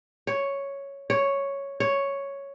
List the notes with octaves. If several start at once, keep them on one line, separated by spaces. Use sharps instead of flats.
C#5
C#5
C#5